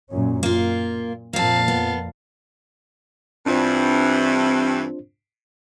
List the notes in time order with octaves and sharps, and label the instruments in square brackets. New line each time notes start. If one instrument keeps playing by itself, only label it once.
[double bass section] F#2 A#2 C#4
[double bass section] A#2 [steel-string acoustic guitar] A#3 F4
[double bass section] F2 A#2 [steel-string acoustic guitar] A#3 C4 [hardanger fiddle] F5 A5
[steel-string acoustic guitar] B3
[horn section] G2 E3 [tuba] C4 [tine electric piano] D4 F4 C5